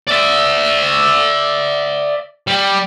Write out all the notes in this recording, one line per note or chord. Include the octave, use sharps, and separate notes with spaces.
D5 E5
G3